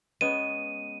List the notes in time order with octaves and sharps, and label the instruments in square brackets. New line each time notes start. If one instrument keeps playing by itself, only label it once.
[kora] G#3 B3 C#4 [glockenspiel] D#7